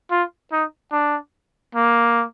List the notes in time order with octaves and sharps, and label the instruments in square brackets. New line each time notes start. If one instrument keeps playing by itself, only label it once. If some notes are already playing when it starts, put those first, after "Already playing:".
[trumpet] F4
D#4
D4
A#3